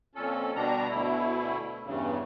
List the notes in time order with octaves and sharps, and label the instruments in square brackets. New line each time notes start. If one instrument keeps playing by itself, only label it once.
[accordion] F2 A#2 C#4 A4
B2 D3 G3 D4 A#5
D2 B2 E4
E2 G2 C#3